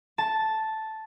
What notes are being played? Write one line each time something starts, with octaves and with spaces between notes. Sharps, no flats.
A5